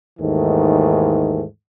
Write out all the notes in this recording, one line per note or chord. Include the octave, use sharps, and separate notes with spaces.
D#2 G#2 D#3 E3 A3